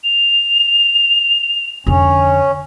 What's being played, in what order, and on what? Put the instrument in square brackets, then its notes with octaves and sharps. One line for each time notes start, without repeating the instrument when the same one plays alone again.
[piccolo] F7
[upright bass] F2 D3 [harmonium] C#4